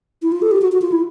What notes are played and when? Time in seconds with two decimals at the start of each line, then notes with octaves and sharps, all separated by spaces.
0.22 E4
0.32 F4
0.42 A4
0.51 G4
0.62 F#4
0.72 F#4
0.82 F4
0.92 E4